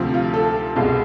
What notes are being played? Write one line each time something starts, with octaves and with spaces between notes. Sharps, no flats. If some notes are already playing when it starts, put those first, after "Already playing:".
Already playing: D2 C3 F3
F4
A4
C2 B2 G#3 F5